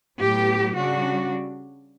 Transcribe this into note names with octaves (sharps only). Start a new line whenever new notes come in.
A2 F#3 B3 G4
C#3 G3 D4 F#4